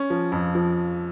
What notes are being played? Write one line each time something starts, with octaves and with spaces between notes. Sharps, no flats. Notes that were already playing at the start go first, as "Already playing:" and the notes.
Already playing: C#4
F3
F2
F3